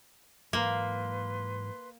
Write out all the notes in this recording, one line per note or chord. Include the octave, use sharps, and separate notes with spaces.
G#2 E3 F#3 A#3 B4 C6